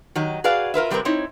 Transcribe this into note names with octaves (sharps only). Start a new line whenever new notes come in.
D#3 F#3 G4 D#5
F#4 G#4 B4 D5 F5
F4 A#4 B4 E5
C3 G3 C4 F4 A#4 B4
C4 D#4 E4 C#5